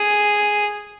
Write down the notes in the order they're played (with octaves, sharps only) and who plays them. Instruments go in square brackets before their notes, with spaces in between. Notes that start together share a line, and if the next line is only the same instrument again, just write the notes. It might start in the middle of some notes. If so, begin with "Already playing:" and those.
Already playing: [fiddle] G#4